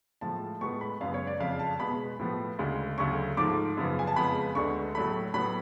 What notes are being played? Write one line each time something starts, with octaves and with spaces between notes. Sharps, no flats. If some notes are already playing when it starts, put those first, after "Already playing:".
A2 F3 G#3 A5
A2 G#3 B3 C#6
B5
F#2 C#3 G#3 B3 F5
C#5
D5
F2 C#3 F3 F5
A5
B2 G#3 B3 B5
A2 F3 B3
D2 C#3 G#3
D2 C#3 F#3 A3 C#6
G#2 F3 A3 D6
F#2 C#3 F3 B3
G#5
A5
F2 C#3 G#3 B3 B5
D2 D3 G#3 B3 C#6
A2 F#3 A3 B5
A2 F#3 B3 B5